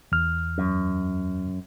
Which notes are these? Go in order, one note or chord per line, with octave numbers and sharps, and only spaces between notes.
E2 F6
F#2